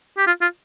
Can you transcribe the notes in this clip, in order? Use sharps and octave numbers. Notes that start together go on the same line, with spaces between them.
G4
F4
F4